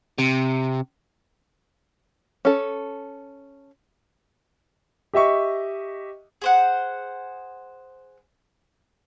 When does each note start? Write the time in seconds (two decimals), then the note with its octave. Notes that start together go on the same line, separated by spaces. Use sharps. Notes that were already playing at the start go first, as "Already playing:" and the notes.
0.18 C3
2.45 C#4 A4
5.14 G4 D#5 E5 C#6
6.42 G#4 C5 F#5